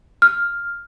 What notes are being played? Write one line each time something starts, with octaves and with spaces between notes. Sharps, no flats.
F6